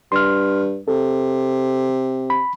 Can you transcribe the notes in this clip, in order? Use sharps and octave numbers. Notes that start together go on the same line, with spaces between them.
G2 C6 F6
C3 A4
B5